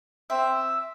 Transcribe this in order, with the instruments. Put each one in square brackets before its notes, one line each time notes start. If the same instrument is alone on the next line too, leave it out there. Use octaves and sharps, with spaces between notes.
[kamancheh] C4 [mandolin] E5